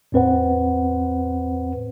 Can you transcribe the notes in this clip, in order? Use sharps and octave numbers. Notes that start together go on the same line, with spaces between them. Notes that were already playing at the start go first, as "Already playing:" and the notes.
E2 A2 C4 B4 C5 F#5